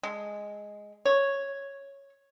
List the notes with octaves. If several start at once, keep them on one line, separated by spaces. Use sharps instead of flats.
G#3
C#5